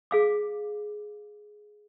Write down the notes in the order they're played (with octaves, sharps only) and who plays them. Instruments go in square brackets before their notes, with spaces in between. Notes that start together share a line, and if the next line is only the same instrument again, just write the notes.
[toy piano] G#4 F5 D6